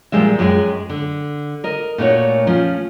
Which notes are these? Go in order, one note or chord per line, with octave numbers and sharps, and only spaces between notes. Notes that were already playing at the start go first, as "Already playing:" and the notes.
A#2 F3 G3 G#3 E5
F#2 G#3 G4 G#4 G5
D3
A#4 D#5
A#2 A3 B3 D#4 F#4 C#5
F3 C#4